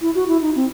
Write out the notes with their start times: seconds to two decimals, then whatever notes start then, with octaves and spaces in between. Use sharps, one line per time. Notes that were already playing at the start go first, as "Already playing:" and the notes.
0.01 E4
0.15 F#4
0.28 E4
0.42 D#4
0.56 C4